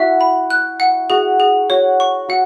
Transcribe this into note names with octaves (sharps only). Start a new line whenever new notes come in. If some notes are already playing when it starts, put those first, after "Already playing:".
Already playing: E4 F#4 E5
B5
F#6
F#5
F#4 G#4
G#4
F#4 C#5
C#6
F#4 F#5